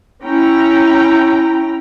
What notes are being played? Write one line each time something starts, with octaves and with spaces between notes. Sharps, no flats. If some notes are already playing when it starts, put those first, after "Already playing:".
C#4 E4 G5 A#5